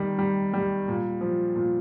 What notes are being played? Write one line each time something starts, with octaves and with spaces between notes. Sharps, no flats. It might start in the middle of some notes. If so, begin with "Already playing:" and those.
Already playing: D#3 G3
G3
G3
A#2
F3
A#2